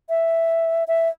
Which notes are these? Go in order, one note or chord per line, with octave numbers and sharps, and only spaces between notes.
E5
E5